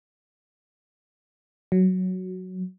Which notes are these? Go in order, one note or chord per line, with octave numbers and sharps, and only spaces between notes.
F#3